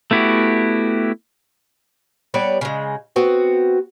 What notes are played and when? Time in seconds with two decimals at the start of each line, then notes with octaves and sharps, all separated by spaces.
0.11 A3 B3 E4 F#4 G4
2.34 G3 B3 C#5 D5
2.61 C#3 G#3
3.16 B3 C4 F#4